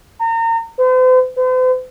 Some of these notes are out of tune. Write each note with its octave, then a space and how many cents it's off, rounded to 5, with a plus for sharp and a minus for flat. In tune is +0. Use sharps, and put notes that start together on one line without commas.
A#5 -35
C5 -45
C5 -45